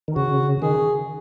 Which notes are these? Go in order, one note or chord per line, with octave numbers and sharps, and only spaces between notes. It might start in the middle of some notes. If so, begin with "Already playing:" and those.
D#3
C#3 F#4
D#3 G#4